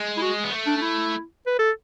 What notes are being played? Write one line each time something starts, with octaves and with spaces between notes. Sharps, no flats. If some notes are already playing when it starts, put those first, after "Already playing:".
Already playing: G#3
E4
F#4
B3
A3
D4
D4
E4
B4
A4